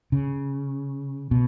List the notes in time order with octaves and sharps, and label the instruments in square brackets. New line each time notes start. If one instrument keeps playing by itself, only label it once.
[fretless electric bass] C#3
B2